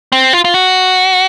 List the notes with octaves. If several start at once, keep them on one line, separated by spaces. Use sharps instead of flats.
C4
F4
F4
F#4